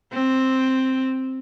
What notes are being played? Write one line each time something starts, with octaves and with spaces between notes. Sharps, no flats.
C4